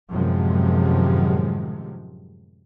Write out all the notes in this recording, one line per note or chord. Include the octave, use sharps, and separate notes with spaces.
F#2 A2 C3 D#3 F3 G#3